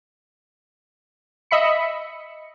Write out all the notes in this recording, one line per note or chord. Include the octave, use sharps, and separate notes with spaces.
D#5 E5 B5 C#7